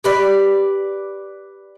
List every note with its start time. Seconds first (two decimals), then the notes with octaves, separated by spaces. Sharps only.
0.04 G4 B4 D5